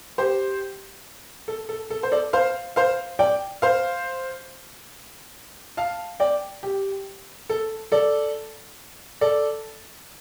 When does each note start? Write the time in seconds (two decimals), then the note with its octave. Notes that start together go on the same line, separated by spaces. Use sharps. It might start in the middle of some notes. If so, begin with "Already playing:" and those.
0.18 G4 C5
1.48 A4
1.69 A4
1.90 A4
2.03 C5
2.12 A4 D5
2.33 C5 F5
2.76 C5 F5
3.19 D5 G5
3.62 C5 F5
5.77 F5 A5
6.20 D5 G5
6.63 G4
7.49 A4
7.92 A4 D5
9.21 A4 D5